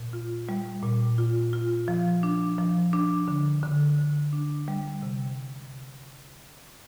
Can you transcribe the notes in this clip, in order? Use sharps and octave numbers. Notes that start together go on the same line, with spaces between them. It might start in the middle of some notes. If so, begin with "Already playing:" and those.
Already playing: A#2
F4
G3
A#2
F4
F4
F3
D4
F3
D4
D3
D3
D3
D4
G3
C3